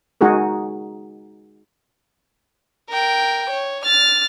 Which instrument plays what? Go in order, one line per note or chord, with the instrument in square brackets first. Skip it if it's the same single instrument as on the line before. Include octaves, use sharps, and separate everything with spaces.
[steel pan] G#3 D#4 F#4 G#4 A#4
[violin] A#4 G5
C#5
F6 A6